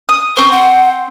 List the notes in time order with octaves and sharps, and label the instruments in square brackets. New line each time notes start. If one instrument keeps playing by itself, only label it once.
[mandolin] D#6
[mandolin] C4 C5 [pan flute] C#6
[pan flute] F#5